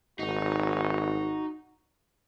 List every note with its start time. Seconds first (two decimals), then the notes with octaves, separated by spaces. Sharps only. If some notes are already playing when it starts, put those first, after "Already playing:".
0.19 G#1 D#4 F#4